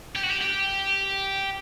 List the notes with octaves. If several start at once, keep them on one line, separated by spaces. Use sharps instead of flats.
G4
F#4
G4
G4